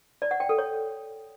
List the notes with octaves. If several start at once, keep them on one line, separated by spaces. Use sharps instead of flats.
D5
F#5
G5
A4
C#5